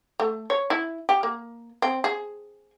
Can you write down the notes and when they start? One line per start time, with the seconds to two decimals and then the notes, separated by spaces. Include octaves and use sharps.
0.20 A3
0.50 C#5
0.70 E4
1.09 G4
1.23 A#3
1.82 C4
2.04 G#4